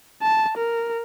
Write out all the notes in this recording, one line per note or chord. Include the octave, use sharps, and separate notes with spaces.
A5
A#4